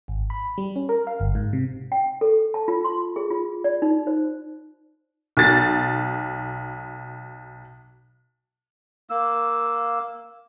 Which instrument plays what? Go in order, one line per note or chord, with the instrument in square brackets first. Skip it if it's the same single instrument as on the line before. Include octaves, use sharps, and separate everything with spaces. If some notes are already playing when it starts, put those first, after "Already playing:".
[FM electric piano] G#1
B5
G3
C#4
A#4
F5
G1
G#2
C3
[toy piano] G5
A4
A5
F4
C6
G#4
F4
D5
D#4
C5
[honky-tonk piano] B1 A6
[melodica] A#3 E6